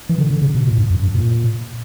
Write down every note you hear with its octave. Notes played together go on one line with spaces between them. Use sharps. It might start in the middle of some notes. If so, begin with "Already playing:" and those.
E3
D3
D3
C#3
B2
A#2
G2
F#2
F#2
A#2